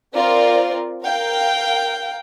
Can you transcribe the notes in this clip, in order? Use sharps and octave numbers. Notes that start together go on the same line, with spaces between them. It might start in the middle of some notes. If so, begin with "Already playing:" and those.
C4 F4 A#4 D5
A#4 F5 G5